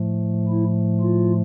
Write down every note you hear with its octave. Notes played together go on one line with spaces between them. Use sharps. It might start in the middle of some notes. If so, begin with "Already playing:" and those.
Already playing: A2 F3 A3
E4
F4